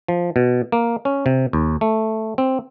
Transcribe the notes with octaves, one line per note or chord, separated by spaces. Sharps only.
F3
B2
A#3
C#4
C3
D#2
A3
C4